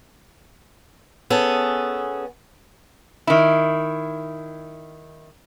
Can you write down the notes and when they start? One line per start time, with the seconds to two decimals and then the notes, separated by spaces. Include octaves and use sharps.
1.30 B3 C#4 G#4 A4
3.27 D#3 E4